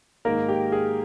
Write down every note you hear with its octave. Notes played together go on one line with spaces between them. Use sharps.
G#2 D#3 G#3 A#3 D#4 A#4
G4
G#4